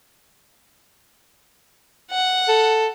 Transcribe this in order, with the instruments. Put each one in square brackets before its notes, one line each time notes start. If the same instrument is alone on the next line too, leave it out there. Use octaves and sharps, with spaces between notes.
[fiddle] F#5
[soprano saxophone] A4